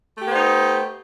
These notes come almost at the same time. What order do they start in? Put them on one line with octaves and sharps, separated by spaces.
A3 G4 B3 C5 D#4